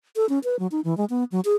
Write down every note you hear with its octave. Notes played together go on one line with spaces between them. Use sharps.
A4
C#4
B4
F#3
D#4
E3
G#3
B3
F#3
G#4